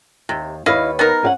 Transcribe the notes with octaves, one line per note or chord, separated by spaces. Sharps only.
D#2 C3
D#2 E4 B4 C#5 D#5 F5
B3 D#4 A#4
C#4 F5 F#5